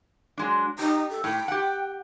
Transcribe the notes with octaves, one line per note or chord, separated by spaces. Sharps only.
F#3 G#3 D4
D#4 G4
A4
A2 G5
G4 F#5